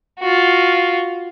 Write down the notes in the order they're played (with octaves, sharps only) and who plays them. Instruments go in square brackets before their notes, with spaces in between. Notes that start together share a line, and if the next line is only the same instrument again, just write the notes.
[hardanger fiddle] F4 F#4